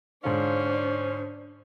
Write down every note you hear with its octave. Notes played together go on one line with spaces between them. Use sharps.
G#2 D3 C#4 D4 F4 C5